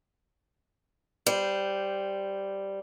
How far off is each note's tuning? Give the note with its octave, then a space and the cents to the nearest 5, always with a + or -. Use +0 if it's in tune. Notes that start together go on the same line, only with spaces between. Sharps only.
G3 +0 C5 -10